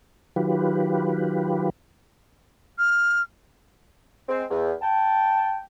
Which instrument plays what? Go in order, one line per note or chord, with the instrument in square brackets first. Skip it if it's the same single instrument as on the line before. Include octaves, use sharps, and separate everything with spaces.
[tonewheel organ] D#3 F#3 F4 G4 B4
[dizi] F6
[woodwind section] G#3 C4
E2
G5 A5